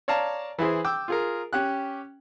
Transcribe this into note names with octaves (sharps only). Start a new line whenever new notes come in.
C#5 D5 F5 A5 A#5
E3 E4 G#4 C5
G5 D6 E6
F4 G#4 A#4
C#4 G4 F#6